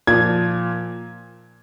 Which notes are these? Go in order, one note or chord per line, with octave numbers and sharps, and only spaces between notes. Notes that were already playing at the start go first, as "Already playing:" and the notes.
A#2 F3 G#6